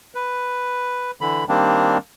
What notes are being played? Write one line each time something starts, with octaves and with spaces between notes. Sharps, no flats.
B4
D3 E3 B5
D#3 G3 A#3 C4 D4